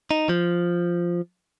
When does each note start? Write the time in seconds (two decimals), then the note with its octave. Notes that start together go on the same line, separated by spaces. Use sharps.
0.11 D#4
0.29 F3